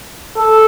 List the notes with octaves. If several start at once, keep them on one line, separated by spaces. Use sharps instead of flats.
A4